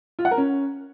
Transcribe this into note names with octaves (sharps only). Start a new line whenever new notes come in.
F4
F#5
A#4
C#4